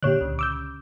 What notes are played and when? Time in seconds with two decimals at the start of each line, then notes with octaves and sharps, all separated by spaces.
0.03 A#2 D3 G4 C#5 F#6
0.21 C#2
0.39 D6 E6 G6